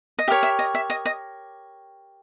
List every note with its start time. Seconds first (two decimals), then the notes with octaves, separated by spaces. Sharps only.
0.19 D#5
0.28 G4 A#4 C#5 E5
0.43 E5
0.59 D#5
0.75 E5
0.90 D#5
1.06 D#5